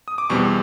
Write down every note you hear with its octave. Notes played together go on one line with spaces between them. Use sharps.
D#6
D6
E2 B2 G3 C4 C#6